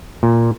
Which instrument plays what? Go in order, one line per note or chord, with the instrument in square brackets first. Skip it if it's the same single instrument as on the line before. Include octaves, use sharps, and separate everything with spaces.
[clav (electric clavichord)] A#2